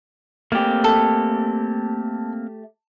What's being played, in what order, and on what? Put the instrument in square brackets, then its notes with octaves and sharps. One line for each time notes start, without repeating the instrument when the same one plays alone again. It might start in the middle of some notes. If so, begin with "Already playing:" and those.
[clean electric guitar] A3 G4 [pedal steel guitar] A#3 C4
[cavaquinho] A4